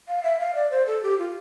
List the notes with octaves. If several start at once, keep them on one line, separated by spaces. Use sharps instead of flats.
F5
E5
F5
D5
C5
A4
G4
F4